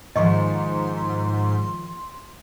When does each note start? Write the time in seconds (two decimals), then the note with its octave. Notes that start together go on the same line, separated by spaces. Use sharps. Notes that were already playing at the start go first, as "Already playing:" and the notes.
0.16 G#2 D#3 F3 C#5 D#5 C6 C#6